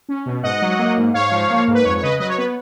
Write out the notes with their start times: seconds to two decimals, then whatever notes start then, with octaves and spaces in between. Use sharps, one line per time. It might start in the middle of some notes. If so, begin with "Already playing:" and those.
0.09 C#4
0.26 B2
0.43 G#2 D#5 F#5
0.62 F#3
0.79 A#3
0.97 G#2
1.14 G#2 C#5 F5
1.31 F3
1.50 A#3
1.68 G#2
1.75 B4
1.85 F2 C#5
1.97 C#5
2.03 C#3 B4 D#5
2.20 F#3 B4 D#5
2.29 C#5
2.38 B3 B4